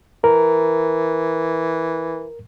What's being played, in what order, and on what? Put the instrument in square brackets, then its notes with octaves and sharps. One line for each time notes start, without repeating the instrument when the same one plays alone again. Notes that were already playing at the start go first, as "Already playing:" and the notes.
[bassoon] E3 [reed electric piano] A#4